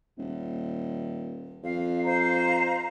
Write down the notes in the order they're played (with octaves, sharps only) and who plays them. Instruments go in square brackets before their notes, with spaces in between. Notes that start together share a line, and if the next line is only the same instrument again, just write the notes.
[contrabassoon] D#1
[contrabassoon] F2 [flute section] F5
[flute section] C5 F5 A#5